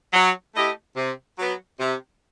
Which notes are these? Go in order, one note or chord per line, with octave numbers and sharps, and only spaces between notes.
F#3
A3 E4 G4 D#5
C3
F#3 B3
C3